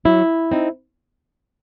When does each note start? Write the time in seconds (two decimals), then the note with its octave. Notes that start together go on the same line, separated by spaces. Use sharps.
0.05 F#3 E4
0.51 C4 D#4